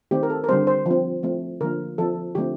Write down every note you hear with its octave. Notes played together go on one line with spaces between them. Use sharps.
D#3 A3 C4 G4
A#4
A4
A#4
D3 G3 C4 C5
C5
F3 C4
F3 A3 C4
D3 F3 A#3 A#4
F3 C4 A4
D3 F3 A3 C4 G4